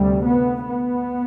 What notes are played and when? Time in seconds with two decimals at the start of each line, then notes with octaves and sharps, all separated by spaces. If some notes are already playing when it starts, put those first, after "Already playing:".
Already playing: D2 C3 G3
0.24 B3
0.66 B3